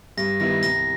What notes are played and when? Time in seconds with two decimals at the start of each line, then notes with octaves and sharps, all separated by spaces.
0.17 G2 A#6
0.40 D#3 G3 B3 E4 A#6
0.63 C2 A#6